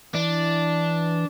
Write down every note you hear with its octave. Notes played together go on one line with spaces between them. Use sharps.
E3 D4